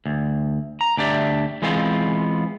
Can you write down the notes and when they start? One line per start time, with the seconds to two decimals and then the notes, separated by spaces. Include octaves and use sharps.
0.06 D2
0.81 A#5
0.97 D2 D4 G4 D5 E5
1.62 E3 G#3 B3 C4 F4